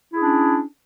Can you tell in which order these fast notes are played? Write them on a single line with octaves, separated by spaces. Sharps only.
E4 G#4 D4 C#4